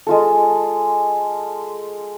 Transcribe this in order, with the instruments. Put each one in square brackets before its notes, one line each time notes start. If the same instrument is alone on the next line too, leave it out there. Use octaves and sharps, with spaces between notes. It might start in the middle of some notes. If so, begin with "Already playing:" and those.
[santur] G#3 F4 A4